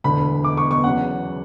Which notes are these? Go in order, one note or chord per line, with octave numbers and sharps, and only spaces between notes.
E1 D2 D3 B5
D6
C#6
C#6
E2 C#3 F#3 F#5